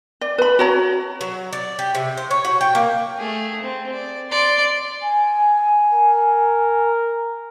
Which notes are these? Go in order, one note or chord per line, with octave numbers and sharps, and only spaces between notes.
D5
B4 B5
F#4 C#5 A#5
F#3
D5
G4
C3
C5
C#5
F#4
G5
A#3
A3 G#4
C4
D5
D5 C6
G#5
A#4